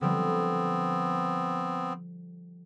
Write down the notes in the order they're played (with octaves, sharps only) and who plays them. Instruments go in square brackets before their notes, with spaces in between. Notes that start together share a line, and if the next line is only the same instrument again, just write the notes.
[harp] D3 F3 G3 [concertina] B3 C4